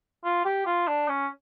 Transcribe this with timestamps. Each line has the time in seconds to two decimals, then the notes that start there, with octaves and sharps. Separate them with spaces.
0.25 F4
0.45 G4
0.66 F4
0.88 D4
1.09 C#4